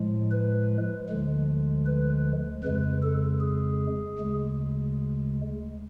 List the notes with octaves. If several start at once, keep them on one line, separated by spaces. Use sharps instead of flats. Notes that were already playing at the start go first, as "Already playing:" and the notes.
Already playing: A2 F3 G#3
B4
D2 D3 F3 G#3
B4
F2 C#3 G#3 B4
A4
G#4
D2 C#3 G#3